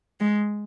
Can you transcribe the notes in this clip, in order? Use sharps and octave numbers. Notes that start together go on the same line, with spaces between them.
G#3